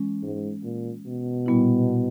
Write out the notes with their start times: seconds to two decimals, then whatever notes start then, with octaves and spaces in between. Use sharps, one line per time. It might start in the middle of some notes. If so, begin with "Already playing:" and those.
Already playing: E3 G#3 C#4
0.23 G#2
0.63 A#2
1.06 B2
1.46 A#2 G3 B3 E4